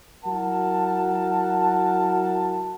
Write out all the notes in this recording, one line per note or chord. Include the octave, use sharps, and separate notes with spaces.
F#3 E4 A#4 F#5 A5